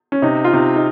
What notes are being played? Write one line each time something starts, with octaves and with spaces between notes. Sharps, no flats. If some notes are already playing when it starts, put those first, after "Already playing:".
C#4
C3 D#4
F4
C3 D#4
D#4